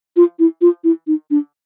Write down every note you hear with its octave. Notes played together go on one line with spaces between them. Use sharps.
F4
E4
F4
E4
D#4
D4